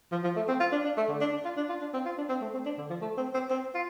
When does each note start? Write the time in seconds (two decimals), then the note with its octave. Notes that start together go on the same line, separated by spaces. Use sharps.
0.12 F3
0.24 F3
0.36 A3
0.48 C4
0.60 F4
0.72 D4
0.84 D4
0.97 A3
1.09 D3
1.21 D4
1.32 D4
1.45 F4
1.57 D4
1.70 F4
1.81 D4
1.94 C4
2.06 F4
2.18 D4
2.29 C4
2.41 A3
2.54 C4
2.66 D4
2.78 D3
2.90 F3
3.02 A3
3.18 C4
3.34 C4
3.50 C4
3.75 F4